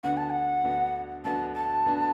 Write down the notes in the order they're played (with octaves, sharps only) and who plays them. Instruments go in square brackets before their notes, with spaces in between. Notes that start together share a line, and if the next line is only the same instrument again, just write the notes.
[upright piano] D2 D3 B3 D4 F#4 [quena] F#5
[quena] A5
F#5
[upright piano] D2 D3 B3 D4 F#4
[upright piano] D2 D3 B3 D4 F#4 [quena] A5
[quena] A5
[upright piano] D2 D3 B3 D4 F#4